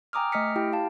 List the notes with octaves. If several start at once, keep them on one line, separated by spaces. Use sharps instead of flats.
G5 G#5 A#5 D6 D#6 F6
A3 D#5 D#6 F6 B6 C#7
E4 G4 G5
F5 A5